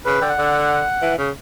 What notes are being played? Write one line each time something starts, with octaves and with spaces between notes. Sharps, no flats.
C#3 B4
D3 G5
F#5
D3
E3
C#3